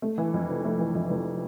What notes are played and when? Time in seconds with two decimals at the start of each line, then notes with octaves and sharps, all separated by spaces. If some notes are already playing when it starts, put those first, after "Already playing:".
0.02 A3
0.18 E3
0.34 F2
0.49 F1
0.65 A3
0.79 E3
0.95 F2
1.10 F1